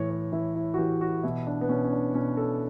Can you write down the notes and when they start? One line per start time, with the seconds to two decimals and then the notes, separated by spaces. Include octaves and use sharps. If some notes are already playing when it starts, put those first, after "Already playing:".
Already playing: A2 E3 C#5
0.10 C#5
0.32 E3 E4
0.56 E4
0.74 F#4
0.78 E3 G4
1.01 F#4
1.23 B2 E4
1.47 D4
1.61 B3
1.69 B2 C#4
1.84 C#4
1.92 D4
2.14 B2 C#4
2.37 A4